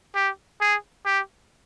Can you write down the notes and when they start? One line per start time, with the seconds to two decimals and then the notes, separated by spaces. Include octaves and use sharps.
0.15 G4
0.61 G#4
1.06 G4